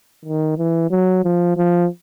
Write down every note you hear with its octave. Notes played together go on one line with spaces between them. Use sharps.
D#3
E3
F#3
F3
F3